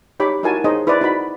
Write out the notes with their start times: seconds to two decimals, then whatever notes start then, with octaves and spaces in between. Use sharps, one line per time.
0.20 D#4 G4 C#5 B5 D6
0.43 D#4 E4 F#4 A#4 G#5 A5
0.64 D#4 G#4 C5 C#5 D#5
0.87 E4 B4 C5 D5
1.01 D#4 F#4 B5